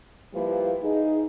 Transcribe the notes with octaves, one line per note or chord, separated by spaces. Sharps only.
F3 G3 A#3 E4 B4
D#4 G#4